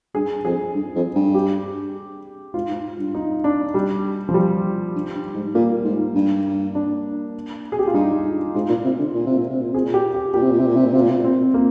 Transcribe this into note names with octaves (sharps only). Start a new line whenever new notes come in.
G2 G#4
F2 G#4
G2
F2
G2
G4
G#2 F4
G#2
G2
D#4
D4
G3
F3
G3
G2
G2
G#2
A#2 A#3
G#2
G2
D4
G#4
G4
F4
G2 D#4
G#2 F4
A#2
C3
D3
A#2
C3
A#2
C3
A#2
C3 G#4
A#2
G4
G4
A#2 G4
C3
A#2
C3
A#2
C3
A#2
C3 F4
A#2
C3
A#2
C4
A#3